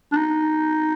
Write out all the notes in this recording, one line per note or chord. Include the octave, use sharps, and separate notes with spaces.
D4
D#4